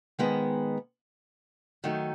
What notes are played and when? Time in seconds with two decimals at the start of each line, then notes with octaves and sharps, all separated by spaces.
0.19 G#2 D#3 G#3 B3
1.84 D#3 F#3 A3 D#4